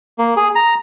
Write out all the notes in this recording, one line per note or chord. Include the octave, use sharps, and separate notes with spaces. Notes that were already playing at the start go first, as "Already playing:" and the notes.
A#3
G#4
A#5